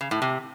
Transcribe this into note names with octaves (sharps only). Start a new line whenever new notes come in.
C#3
A2
C3